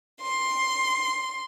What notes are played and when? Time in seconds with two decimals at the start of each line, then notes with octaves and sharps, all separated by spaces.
0.20 C6